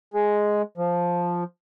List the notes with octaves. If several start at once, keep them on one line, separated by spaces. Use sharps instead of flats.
G#3
F3